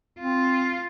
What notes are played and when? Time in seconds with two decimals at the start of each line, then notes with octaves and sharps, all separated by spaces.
0.19 C4 F4